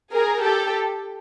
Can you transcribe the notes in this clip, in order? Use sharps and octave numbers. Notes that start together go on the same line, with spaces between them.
G#4 A#4
G4 A4